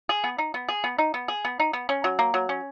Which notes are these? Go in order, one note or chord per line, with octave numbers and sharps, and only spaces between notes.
G#4
B3
D#4
B3
G#4
B3
D#4
B3
G#4
B3
D#4
B3
C#4
F#3
A#3
F#3
C#4